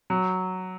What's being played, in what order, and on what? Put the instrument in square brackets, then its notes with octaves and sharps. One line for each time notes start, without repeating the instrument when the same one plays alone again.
[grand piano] F#3